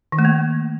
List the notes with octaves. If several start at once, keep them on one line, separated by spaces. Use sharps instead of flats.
D#3
A3
A#3